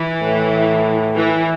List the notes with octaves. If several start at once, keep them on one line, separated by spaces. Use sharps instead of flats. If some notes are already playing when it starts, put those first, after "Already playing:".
Already playing: E3
A2
E3